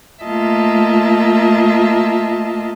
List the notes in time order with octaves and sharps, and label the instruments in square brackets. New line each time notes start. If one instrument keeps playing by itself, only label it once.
[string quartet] A3 A#3 F4 D#5 E5 A5